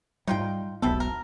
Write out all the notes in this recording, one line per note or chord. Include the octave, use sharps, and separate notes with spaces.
G#2 G3 D#4 F4 G5
E1 B1 C3 G3 B3 A4
A#4